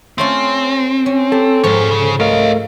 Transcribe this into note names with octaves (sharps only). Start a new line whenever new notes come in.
A3 C4 C#4 F4
C#4
G4 A4
G#2 F3 A#4 C#5
C#3
A3 A#4 C#5 D#5 F5